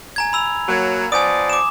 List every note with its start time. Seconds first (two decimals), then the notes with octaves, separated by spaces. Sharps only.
0.16 G#5 A#5 G#6
0.33 B5 E6 F7
0.69 F#3 A#3
1.12 F3 B3 D5 G#5 D#6
1.50 D6 E7